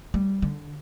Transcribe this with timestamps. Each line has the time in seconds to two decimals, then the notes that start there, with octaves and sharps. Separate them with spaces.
0.14 G3
0.42 D3